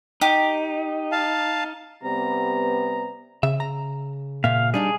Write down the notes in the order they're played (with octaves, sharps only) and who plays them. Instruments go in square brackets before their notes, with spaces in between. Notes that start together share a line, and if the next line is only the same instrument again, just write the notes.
[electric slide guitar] D#4 [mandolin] G4
[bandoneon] F5 A5
[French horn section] C3 G3 B3 [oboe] A#5
[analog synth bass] C#3 [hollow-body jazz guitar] E5
[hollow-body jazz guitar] A#5
[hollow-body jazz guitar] A#2 E5 [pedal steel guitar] F5
[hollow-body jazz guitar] G3 D4 D#4 [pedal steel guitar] G#4